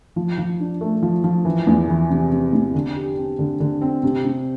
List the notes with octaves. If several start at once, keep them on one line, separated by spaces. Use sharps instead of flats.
F3
F3
D4
A3
F3
F3
E3
E2
E3
C3
C3
E2
D3
G4
C4
D3
D3
C4
C3
C3